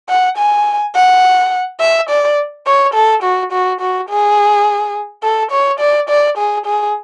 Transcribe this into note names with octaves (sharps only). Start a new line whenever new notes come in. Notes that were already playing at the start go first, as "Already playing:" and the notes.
F#5
G#5
F#5
E5
D5
C#5
A4
F#4
F#4
F#4
G#4
A4
C#5
D5
D5
G#4
G#4